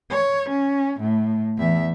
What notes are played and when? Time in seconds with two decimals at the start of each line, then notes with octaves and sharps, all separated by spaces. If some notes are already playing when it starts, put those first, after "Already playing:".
0.10 C#5
0.49 C#4
1.00 A2
1.58 E2 E5